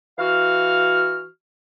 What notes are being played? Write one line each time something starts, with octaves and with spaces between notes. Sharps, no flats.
E3 F#4 F5 F6